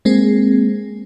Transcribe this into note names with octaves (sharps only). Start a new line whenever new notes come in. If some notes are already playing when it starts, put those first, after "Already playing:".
G#3 A#3 C4 G#4